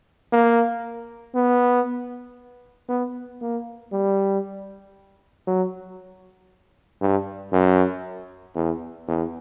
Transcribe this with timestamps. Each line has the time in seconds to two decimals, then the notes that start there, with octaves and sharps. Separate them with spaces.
0.33 A#3
1.35 B3
2.89 B3
3.42 A#3
3.93 G3
5.47 F#3
7.01 G2
7.52 F#2
8.55 E2
9.08 E2